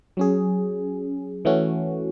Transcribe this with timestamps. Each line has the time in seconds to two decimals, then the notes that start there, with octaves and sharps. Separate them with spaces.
0.17 F#3 C#4 G#4
1.45 E3 A3 C#4 F#4